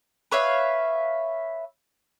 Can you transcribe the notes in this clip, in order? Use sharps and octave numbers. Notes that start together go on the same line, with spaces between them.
B4 C#5 E5 F5